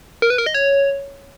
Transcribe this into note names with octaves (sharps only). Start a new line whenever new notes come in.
A#4
B4
A#4
D#5
C#5